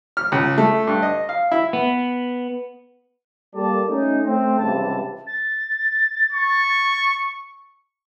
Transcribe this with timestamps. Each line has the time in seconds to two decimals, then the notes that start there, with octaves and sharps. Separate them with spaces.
0.17 F6
0.32 C#2
0.58 A3
0.87 G2
1.02 D#5
1.29 F5
1.52 E4
1.73 B3
3.55 G3 A#3 A4 D5 A5
3.88 A3 C#4 D#4
4.25 A3 C4
4.59 C#2 G2 C3 E3 A5
5.27 A6
6.32 C#6